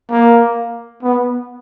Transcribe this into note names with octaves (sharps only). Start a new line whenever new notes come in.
A#3
B3